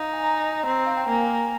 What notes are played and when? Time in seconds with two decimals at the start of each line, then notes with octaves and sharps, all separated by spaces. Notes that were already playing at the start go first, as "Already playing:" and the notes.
Already playing: D#4 F5
0.13 G#5
0.24 A#5
0.44 A#5
0.66 C4 A#5
0.86 F5
0.97 G5
1.08 A#3 G#5